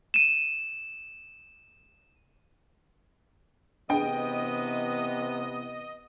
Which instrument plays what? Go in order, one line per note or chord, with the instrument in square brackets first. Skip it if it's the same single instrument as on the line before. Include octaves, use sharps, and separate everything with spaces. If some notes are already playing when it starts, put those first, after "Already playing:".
[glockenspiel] D#7 E7
[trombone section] C3 E3 B3 [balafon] D4 G#4 [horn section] D#5 [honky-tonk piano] G5